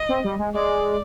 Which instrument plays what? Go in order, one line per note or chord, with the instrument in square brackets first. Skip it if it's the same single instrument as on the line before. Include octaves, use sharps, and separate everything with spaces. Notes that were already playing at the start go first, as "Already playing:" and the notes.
Already playing: [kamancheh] D#5
[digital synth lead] C4
G3
G#3
[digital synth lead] G#3 [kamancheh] D5